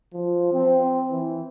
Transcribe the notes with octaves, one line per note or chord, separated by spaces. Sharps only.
F3
C4
E3